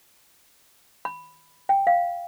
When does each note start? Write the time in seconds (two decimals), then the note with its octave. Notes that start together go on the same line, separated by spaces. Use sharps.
1.05 B5
1.69 G5
1.87 F5